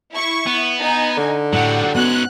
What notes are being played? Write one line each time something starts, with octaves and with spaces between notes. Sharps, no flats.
E4 C#6
B3
D#4 G#5
D3
A2 F#3 G3 F#5
G#2 B3 C#4 F#4 F#6